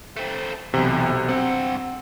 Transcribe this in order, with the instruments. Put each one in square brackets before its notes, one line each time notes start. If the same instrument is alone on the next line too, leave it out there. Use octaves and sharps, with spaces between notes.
[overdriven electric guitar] A3 C4
[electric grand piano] B1 C3 [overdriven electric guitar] E2
[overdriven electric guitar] G2 F#5 [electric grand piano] C4